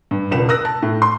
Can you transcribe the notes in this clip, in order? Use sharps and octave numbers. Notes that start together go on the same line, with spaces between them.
G2
E1 C#2 B4 E7
A#4 D#6 E6 F#6 A#6
A5
A2
C6